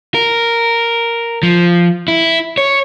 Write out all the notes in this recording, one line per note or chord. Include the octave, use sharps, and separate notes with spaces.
A#4
F3
E4
C#5